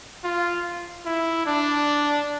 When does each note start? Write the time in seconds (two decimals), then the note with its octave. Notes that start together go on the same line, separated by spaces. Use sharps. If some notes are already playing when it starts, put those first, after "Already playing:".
0.24 F4
1.06 E4
1.47 D4